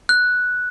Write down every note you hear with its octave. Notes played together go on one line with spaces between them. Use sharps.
F#6